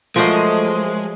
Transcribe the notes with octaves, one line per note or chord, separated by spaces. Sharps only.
F3 F#3 G#3 A3 F#4 A#4 C5 D#5